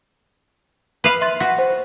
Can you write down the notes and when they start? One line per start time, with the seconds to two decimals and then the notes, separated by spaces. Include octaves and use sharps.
1.04 B4 F5
1.21 E5 C6 A6
1.40 F#4 B6
1.58 C5